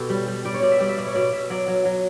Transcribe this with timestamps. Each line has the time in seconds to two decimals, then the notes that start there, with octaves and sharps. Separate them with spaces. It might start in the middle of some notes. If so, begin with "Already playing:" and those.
Already playing: B2 G4 A4
0.10 G3
0.28 G3
0.45 G3 D5
0.54 C#5
0.62 B2 D5
0.72 E5
0.80 G3 D5
0.89 E5
0.98 B2 D5
1.07 C#5
1.15 B2 D5
1.32 B2 E5
1.50 F#3 D5
1.68 F#3
1.85 F#3